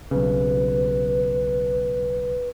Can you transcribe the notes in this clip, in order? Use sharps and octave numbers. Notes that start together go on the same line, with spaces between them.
B1 C#3 B4